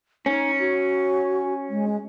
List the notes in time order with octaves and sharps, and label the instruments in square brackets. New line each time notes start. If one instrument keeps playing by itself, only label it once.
[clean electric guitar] C#4 [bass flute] D#4
[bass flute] F#4
G#3